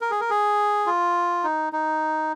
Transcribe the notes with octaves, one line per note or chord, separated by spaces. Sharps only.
A#4
G#4
A#4
G#4
F4
D#4
D#4